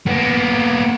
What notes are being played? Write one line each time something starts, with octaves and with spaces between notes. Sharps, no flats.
A#3 B3